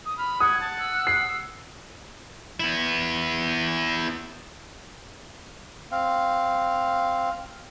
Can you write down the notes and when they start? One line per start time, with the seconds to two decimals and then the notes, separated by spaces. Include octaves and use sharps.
0.06 D#6
0.18 B5 F6
0.40 F#5 D#6 G#6
0.61 A5
0.79 E6
1.07 C7
2.60 B3 E4
5.92 C4 F5